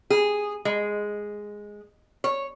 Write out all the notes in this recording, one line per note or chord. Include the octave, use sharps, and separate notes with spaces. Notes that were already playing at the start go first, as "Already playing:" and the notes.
G#4
G#3
C#5